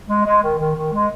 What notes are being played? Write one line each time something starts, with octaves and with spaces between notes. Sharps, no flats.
G#3
G#3
D#3
D#3
D#3
G#3